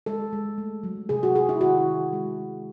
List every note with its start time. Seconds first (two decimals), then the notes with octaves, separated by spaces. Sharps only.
0.06 G#3 A4
0.33 G#3
0.58 A3
0.83 F#3
1.09 C3 G#4
1.23 F#4
1.35 C3 G#4
1.49 E4
1.61 D#3 F#4
1.87 D#3
2.13 G#3